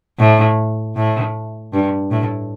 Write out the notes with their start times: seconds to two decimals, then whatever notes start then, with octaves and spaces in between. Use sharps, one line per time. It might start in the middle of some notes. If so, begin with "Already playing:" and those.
0.19 A2
0.96 A2
1.73 G2
2.12 A2